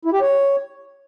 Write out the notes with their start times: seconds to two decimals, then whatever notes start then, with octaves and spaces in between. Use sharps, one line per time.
0.05 E4
0.13 G4
0.21 C#5